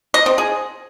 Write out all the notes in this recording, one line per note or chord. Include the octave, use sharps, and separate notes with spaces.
D#5
C4
G#4